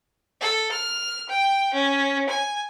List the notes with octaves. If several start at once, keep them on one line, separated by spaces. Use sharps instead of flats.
A4
F6
G5
C#4
G#5